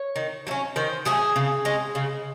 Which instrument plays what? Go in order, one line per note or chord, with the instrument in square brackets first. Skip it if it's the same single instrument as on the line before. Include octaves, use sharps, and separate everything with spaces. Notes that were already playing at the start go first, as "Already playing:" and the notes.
Already playing: [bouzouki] C#5
D#3
F#3 A3
C#4
D#3 C5
F#3 A3 C#4 G#4
C#3
G#3 C#4
C#3